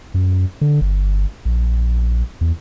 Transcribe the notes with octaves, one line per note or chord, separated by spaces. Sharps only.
F#2
D3
G1
A#1
E2